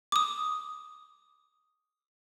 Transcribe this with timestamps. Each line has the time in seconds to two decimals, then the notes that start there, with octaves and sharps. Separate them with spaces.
0.12 D6 D#6